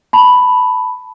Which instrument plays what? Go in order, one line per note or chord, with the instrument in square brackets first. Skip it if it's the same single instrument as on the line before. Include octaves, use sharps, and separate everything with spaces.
[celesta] A5 B5